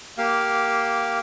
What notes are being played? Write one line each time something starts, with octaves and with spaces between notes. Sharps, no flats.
A#3 G4 F5